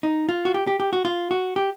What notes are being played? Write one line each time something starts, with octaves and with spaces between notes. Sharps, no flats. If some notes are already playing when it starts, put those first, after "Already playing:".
D#4
F4
F#4
G4
G4
G4
F#4
F4
F#4
G4